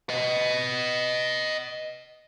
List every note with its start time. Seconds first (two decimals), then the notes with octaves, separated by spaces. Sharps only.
0.09 B4 D#5